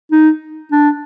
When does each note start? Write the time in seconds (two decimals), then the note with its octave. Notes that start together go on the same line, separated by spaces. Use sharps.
0.12 D#4
0.72 D4